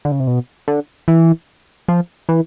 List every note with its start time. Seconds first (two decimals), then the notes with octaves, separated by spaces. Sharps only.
0.05 D3
0.12 C#3
0.20 C3
0.27 B2
0.68 D3
1.08 E3
1.88 F3
2.29 E3